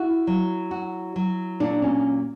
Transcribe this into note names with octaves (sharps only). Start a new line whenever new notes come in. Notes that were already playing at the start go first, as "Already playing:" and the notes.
Already playing: E4 F#4
F#3
F#4
F#3
A#2 D4
C#4